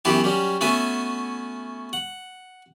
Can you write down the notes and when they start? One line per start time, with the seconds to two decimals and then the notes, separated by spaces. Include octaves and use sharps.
0.05 F#2 E3 B3 E4 F#4 G4
0.24 F#3 G3 C#4
0.61 A3 B3 C#4 F#4 E5 G#5
1.93 F#5